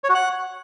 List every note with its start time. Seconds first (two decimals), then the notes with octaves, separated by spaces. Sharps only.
0.04 C#5
0.09 F#4
0.15 F#5